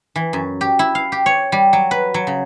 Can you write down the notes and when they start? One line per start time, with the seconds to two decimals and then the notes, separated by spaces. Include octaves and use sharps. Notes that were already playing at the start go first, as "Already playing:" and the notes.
0.16 E3
0.33 F#2
0.61 G4
0.79 E4
0.95 F5
1.12 G4
1.26 C#5
1.52 G3
1.73 F#3
1.91 B4
2.14 F#3
2.27 C#3